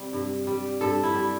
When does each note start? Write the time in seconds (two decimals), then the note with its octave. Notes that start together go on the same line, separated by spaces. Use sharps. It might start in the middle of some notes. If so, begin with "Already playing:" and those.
Already playing: C3 G3
0.13 G2
0.47 G3
0.81 G2 A4
1.03 E4
1.14 G3